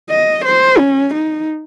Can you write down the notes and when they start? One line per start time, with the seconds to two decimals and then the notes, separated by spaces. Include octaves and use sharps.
0.10 D#5
0.45 C5
0.79 C#4
1.14 D#4